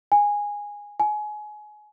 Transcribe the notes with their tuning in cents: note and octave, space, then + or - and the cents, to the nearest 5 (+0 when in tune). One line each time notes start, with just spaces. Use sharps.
G#5 -10
G#5 +25